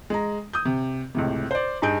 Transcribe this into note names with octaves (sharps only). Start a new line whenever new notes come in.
G#3 A#5
D#6 G6
C3
C#2 A2 C3
C5 D5
G2 D#4 G#4 G6 D7